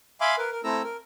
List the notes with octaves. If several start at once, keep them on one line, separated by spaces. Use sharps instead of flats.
E5 F5 G#5 B5 C6 D6
A#4 B4
A#4
A3 C4 E4 A4 A#5 E6
A#4